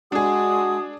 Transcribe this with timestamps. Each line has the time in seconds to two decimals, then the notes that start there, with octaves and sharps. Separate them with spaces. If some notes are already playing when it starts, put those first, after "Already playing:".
0.12 G#3 D4 F#4 G#4 D#6